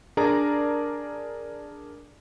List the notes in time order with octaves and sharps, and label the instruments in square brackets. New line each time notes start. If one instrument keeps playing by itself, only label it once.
[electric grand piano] D4 G#4 A#4 D5 A5 A#5